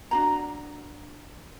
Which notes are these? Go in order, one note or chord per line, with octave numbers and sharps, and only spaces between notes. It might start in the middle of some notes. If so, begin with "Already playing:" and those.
D4 F#4 A#5